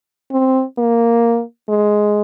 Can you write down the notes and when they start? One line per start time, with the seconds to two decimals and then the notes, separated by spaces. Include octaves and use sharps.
0.32 C4
0.78 A#3
1.69 G#3